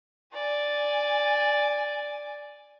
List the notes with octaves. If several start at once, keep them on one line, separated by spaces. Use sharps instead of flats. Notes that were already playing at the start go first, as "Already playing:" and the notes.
D5 G#5